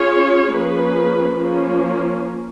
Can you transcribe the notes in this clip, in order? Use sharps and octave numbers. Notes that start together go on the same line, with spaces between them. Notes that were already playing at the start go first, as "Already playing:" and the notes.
Already playing: C#4 F4 G#4 C#5
F3 A#3 C#4 G#4 B4
F3 A#3 C#4